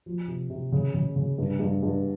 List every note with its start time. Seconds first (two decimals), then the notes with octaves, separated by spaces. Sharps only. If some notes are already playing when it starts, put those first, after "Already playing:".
0.06 F3
0.28 C3
0.50 C3
0.72 C#3
0.94 C#3
1.16 C#3
1.38 G2
1.60 G2
1.83 G2